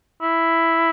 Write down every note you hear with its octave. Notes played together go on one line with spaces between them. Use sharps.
E4